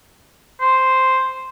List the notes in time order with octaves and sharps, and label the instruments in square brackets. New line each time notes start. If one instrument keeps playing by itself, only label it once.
[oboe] C5